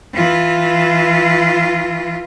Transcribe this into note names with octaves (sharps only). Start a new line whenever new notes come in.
E3 F4